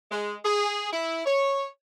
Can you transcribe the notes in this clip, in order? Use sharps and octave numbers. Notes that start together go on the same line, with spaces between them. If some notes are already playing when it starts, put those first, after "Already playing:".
G#3
G#4
E4
C#5